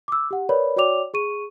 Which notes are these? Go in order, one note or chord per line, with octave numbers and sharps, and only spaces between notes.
D6 E6
G4 F#5
A#4 B4 C#5 D5 B5
F#4 C#5 D5 G5 D6 F7
G#4 C#6 D#7